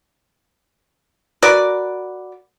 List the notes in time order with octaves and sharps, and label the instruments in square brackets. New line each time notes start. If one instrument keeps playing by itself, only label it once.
[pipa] F#4 A#4 B4 D5